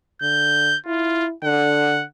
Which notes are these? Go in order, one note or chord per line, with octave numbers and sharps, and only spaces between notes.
D3 G6
E4 F4
D3 F#5